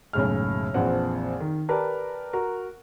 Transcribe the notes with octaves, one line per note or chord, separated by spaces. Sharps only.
F#1 B1 A2 C#3 G#3 F6
A#1 F2 E3 F3 C4 F#5
D#3
G4 A#4 B4 D5 A5
F#4 A#4